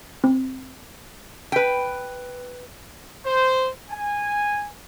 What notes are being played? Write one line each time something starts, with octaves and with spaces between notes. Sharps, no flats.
C4
B4 G5
C5
G#5